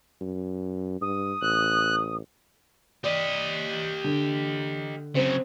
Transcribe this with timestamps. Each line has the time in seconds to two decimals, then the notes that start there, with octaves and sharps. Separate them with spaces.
0.21 F#2
1.01 G2 D#6
1.42 A1 F#6
3.04 G4 D5 D#5
4.04 D3
5.15 C#3 F#3 C4